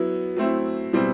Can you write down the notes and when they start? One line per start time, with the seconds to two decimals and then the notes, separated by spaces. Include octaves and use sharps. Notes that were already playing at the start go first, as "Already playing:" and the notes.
Already playing: F#3 B3 E4
0.36 F#3 A3 C4 E4
0.93 B2 G3 C4 E4